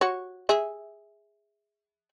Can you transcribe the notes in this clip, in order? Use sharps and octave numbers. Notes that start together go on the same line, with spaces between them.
F#4 C#5
G#4 E5